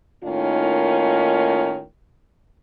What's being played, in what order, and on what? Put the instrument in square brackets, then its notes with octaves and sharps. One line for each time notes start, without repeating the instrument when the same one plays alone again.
[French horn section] A2 D#3 A#3 C#4 D#4 F4